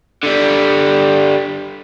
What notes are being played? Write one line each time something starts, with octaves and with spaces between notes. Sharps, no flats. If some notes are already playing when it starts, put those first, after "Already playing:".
D3 G3